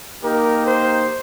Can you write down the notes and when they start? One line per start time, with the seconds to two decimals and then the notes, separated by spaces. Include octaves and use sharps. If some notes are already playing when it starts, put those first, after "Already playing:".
0.23 A#3 D#4 G4 A#4
0.65 C5